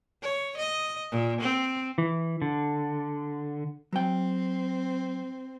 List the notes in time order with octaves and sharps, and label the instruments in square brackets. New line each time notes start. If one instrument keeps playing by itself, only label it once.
[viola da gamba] C#5
D#5
A#2
C4
[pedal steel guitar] E3
D3
[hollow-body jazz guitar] F#3 G5 [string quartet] C4